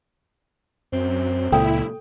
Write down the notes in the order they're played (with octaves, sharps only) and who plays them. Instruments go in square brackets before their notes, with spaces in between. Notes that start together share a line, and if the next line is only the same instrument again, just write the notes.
[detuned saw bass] F#2 [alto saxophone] C4
[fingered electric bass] C#2 A#2 [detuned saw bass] E4 [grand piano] A4 G5 D#6